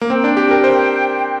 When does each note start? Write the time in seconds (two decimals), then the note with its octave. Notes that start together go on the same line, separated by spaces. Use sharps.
0.01 A#3
0.10 C4 G5
0.24 D4
0.37 G4
0.51 A#4
0.64 C5